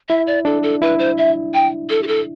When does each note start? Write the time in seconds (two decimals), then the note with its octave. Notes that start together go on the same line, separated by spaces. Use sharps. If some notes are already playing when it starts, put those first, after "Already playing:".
0.09 E4 E5
0.27 D5
0.45 D4 A4
0.63 A4
0.82 E4 B4
0.99 C5
1.17 E5
1.54 G5
1.90 A4
2.03 G4
2.07 A4